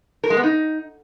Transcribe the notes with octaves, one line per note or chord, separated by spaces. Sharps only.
A#4
G#3
B3
D#4